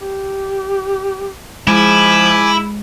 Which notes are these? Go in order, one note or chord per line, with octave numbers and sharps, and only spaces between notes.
G4
F3 G#3 E4 G#5 D6